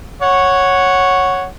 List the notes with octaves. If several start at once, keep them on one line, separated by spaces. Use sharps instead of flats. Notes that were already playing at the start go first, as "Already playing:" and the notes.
C#5 F#5